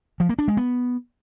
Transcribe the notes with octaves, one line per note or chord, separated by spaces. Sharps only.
F3
A#3
D4
G#3
B3